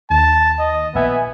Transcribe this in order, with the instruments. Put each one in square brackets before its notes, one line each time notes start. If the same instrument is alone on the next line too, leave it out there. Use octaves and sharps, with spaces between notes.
[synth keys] D#2 [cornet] A5
[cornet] D#5
[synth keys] A#1 E5 G#5 [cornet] B3